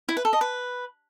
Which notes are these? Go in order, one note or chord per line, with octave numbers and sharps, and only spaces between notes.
E4
B4
A4
D#5
B4